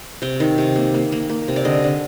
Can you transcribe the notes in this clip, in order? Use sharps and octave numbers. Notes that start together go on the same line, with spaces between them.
C3 G5
D#3
C3
A#3
A#3
A#3
A#3
C3
D5
D3 D#5
D3